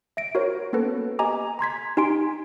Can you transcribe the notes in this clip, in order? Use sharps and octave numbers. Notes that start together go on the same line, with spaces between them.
E5 A#6 D7
F#4 A#4 C5 C#5
A#3 B3 C#4 A4 B4
G4 D#5 G#5 A#5 D6
A#5 C6 G#6 B6
D#4 G4 G#5 C6 D7